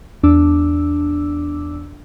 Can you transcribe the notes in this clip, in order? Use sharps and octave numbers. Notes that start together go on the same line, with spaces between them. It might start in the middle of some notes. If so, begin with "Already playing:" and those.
E2 D4 D6 E6